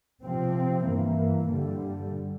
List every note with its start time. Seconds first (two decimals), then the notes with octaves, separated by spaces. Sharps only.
0.22 C3 F3 C4
0.84 G2 E3 A#3
1.46 G2 D3 G3